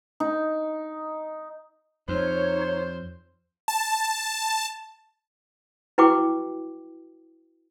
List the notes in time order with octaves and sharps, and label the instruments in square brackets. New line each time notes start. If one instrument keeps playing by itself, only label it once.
[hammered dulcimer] D#4
[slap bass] F2 [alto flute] D#4 [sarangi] C5 [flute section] C#5
[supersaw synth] A5
[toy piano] E4 F#4 B4 G5 C#6 D6